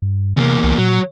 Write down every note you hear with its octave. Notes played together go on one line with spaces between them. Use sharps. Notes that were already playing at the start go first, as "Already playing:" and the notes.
G2
E2 C3 A#3
C2
A#2 F#3